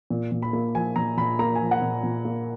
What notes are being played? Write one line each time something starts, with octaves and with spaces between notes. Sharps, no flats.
A#2
A#2
B5
A#3
F3 G#5
A#2 A#5
A#2 B5
A#3 A#5
G#5
F3
F#5
A#2
A#2
A#3